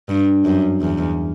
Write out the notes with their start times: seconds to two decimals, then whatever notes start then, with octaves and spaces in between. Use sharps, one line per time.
0.09 G2
0.45 F#2
0.82 E2